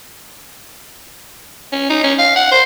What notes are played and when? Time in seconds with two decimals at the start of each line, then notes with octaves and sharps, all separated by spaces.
1.73 C#4
1.89 D#4
2.03 C#4
2.18 F5
2.36 F#5
2.52 C5